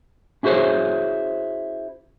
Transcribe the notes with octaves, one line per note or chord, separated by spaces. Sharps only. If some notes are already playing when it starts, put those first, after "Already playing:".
C#4 E4 F#4 G#4 C5 C#5